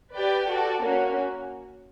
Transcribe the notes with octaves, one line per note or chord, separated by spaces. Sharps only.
G4 B4 D5 G5
F#4 A4 D5
A#3 C#4 F#4